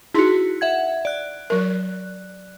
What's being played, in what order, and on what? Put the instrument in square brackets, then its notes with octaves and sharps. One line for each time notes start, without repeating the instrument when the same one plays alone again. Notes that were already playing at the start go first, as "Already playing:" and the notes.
[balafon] D#4 G#4 C6 [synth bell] E4 F#4
[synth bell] E5 F#5 G#6
D5 F#6
[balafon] F#3 A#4